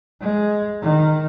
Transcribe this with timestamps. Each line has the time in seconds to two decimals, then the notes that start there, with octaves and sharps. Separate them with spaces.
0.21 G#3
0.81 D#3